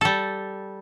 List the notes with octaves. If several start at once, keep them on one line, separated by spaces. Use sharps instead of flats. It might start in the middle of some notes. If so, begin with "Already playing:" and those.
G3 A4